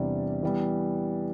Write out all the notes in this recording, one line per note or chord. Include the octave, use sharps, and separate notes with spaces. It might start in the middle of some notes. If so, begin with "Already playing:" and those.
Already playing: E2 C3 G3 D4
E3 G3 B3